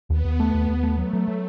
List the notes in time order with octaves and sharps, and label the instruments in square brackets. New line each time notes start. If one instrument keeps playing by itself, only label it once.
[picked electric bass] D#2 [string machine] B3
[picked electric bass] D#2
A3
D#2
D#2
A3
[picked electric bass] F#3 [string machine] A3
[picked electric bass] F#3
F#3